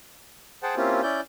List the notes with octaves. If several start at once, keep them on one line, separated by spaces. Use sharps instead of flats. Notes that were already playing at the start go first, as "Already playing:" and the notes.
G#4 C5 F#5 G5 A5
A#3 C4 C#4 E4 F4 G4
C#4 E4 D5 G6